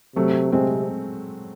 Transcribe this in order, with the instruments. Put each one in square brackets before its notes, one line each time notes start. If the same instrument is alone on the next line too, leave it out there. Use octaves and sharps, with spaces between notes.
[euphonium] C3 [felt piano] F#3 A3
[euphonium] C3 [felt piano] G#3 C4